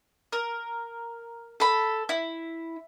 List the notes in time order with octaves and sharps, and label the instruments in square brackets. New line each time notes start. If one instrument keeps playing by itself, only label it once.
[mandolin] A#4
A4 B5
E4